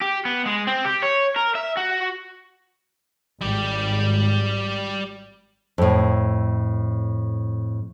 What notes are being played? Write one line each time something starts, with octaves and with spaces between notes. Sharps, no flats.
G4
B3
G#3
C4
G4
C#5
A#4
E5
F#4
G#1 G3 G4
F2 A2